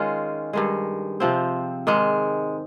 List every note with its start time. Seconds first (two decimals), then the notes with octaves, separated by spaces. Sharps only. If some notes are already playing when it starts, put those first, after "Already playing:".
Already playing: D#3 G#3 C#4 F4
0.53 G2 D#3 G#3
1.20 C3 F3 C4
1.87 G#2 D#3 G#3